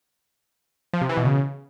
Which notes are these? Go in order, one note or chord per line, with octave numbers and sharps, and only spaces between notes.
F3
C3
E3
B2
C#3